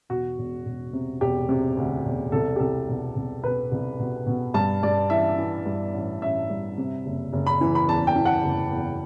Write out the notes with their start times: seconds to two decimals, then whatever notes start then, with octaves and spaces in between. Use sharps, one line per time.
0.09 E1 F#4
0.38 E1
0.65 E1
0.93 C3
1.21 E1 G4
1.49 C3
1.77 D2
2.05 E1
2.32 C2 A4
2.56 G4
2.60 C2 A4
2.88 B2
3.15 C2
3.44 B2 B4
3.71 C2
3.99 B2
4.26 B2
4.54 G2 A5
4.83 G2 D5
5.10 E3 E5
5.38 E3
5.66 G2
5.94 A1
6.22 A1 E5
6.50 G2
6.78 C3
7.06 F#1
7.33 F#1
7.47 B5
7.61 E3
7.75 B5
7.89 E2 A5
8.07 G5
8.16 E3
8.26 F#5
8.44 F#1
8.72 E2